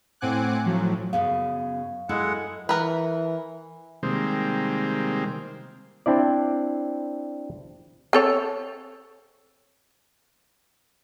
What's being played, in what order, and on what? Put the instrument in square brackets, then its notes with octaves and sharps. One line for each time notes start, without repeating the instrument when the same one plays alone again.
[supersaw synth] A2 C4 F#5 G#5 D6 F#6
A2 F3 F#3
[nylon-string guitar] F#2 C#3 B3 [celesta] F5
[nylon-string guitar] F#2 E4 A4 [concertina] G#3 F#5
[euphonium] E3 [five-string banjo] A#4 B4
[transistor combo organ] C3 D#3 G3 G#3 A#3 C4
[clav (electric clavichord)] C4 D4 E4 D5
[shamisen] C4 A4 C#5